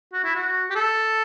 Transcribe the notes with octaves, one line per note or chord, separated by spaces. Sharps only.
F#4
E4
F#4
G4
A4